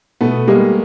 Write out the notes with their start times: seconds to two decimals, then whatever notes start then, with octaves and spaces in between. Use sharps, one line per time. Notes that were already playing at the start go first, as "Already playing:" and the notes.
0.21 B2 A3 B3
0.48 G3 G#3 A#3